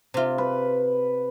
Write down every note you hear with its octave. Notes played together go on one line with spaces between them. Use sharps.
C3 F4
B4